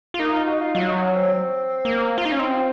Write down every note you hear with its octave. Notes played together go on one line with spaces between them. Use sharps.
F4
A#3 D#4
F4
F#4
F4
F#3 F4
D#4
C#4
C4
A#3
F4
D#4
C#4
C4 D#4
F4